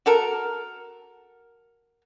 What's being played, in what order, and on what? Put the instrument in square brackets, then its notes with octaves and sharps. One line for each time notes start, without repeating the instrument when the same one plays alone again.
[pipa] F#4 A4 A#4